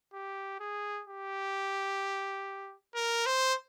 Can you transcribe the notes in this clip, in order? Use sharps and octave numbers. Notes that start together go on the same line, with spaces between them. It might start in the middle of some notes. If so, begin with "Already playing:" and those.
G4
G#4
G4
A#4
C5